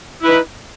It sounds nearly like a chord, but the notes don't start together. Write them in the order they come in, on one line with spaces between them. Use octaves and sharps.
E4 B4 D#4